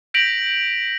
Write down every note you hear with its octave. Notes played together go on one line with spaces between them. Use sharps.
G6 A#6 B6 D7 F7 F#7